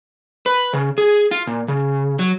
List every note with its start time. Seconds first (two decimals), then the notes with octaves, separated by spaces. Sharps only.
0.46 B4
0.73 C#3
0.98 G#4
1.31 F4
1.47 A#2
1.68 C#3
2.19 F#3